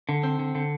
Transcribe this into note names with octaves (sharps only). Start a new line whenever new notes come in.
D3
C4
D3
D3